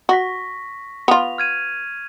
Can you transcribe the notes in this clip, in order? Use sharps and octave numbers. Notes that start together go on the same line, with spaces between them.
F#4 C#6 A#6 B6
B3 F4 F7
F6 G#6 D#7